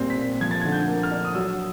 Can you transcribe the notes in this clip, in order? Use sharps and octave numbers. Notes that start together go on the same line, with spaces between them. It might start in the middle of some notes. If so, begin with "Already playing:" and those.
Already playing: A#2 G3 C4
B6
A#2
F3 G#6
A6
D3 G#6
G6
A#3
F6
D4
D#6
F#3 E6